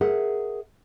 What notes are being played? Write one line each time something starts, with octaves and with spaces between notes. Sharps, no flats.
G#4 A#4 E5 F#5